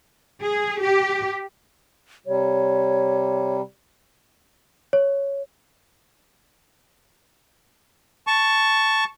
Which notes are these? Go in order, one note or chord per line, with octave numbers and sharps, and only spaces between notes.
G#4
G4
C3 G3 C#5
C#5
A5 C#6